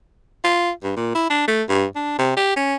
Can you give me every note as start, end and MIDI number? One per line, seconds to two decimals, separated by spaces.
0.44 0.70 65
0.83 0.93 43
0.96 1.13 46
1.15 1.29 64
1.30 1.44 62
1.48 1.63 57
1.69 1.85 43
1.96 2.17 62
2.18 2.32 48
2.37 2.55 67
2.56 2.76 61